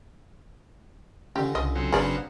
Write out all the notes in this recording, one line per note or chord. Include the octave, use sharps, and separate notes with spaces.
C#2 D3 C#4 G4
C2 D#5
C#3 F#3 C4
G1 A#3 B3 D4 G#4 D5